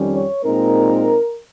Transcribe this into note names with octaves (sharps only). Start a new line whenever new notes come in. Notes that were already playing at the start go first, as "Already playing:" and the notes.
Already playing: F2 D#3 G3 C#4
C#5
A#2 G#3 C4 D#4 A#4